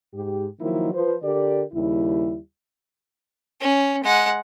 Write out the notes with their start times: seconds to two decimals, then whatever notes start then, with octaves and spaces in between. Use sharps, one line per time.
0.14 G#2 G4
0.60 D#3 F3 F#3 A#3 D#4 E4
0.94 F3 B4 C5
1.23 D3 G4 A#4 D5
1.72 D#2 C#3 G3 E4
3.60 C#4
4.03 G#3 F#5